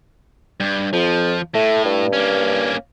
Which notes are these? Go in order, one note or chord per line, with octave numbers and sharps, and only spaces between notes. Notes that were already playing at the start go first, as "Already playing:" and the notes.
G2
F2 F3
A2 A3
G2
A#3 C#4